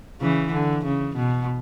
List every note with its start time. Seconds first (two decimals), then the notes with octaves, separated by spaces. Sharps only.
0.21 C#3 E3
0.53 D3
0.85 C#3
1.16 B2